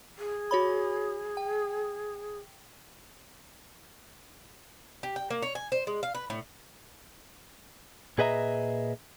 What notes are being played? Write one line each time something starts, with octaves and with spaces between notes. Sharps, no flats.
G#4
F#4 C#5 B5
G5
G4
G5
A#3
C#5
G#5
C5
G#3
F5
B4
A2
A#2 G#4 B4 D#5 E5 A#5